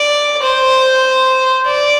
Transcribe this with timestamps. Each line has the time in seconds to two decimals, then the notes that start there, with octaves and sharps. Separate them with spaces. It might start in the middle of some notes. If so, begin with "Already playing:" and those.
Already playing: D5
0.42 C5
1.67 D5